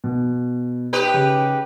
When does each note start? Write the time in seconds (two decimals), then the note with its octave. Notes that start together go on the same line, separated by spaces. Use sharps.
0.04 B2
0.93 D#4 G4 B4
1.14 C#3